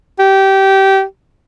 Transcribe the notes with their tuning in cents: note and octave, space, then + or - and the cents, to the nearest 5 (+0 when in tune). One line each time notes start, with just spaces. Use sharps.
G4 -20